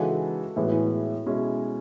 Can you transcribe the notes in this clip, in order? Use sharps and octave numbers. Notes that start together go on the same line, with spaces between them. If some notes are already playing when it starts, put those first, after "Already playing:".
Already playing: C#3 E3 G#3 D#4 F#4 A4
A2 E3 G#3 B3 G#4
F#4
E4 G#4
B2 G#3 C#4 E4